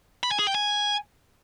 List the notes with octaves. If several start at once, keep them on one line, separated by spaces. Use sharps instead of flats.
B5
G#5
G#4
G5
G#5